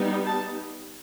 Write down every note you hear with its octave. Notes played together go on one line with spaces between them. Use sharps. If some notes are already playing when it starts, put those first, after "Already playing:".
Already playing: G3 B3 D#4
A5